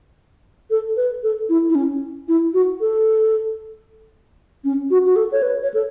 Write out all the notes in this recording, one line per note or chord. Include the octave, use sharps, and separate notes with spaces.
A4
B4
A4
E4
E4
C#4
E4
F#4
A4
C#4
F#4
F#4
A4
C#5
B4
C#5
A4